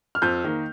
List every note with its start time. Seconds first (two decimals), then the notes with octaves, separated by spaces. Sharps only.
0.15 F6
0.22 F2 G6
0.44 D#3 A#3